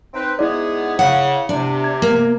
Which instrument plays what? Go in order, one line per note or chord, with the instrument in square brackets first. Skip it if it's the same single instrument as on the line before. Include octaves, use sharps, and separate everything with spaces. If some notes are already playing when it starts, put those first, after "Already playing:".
[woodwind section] C4 D#4 B4
[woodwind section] G#2 B3 G#4 [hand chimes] E4 D5
[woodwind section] C#3 [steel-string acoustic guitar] F#5
[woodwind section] C3 [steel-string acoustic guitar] D4
[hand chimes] G#6
[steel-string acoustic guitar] A#3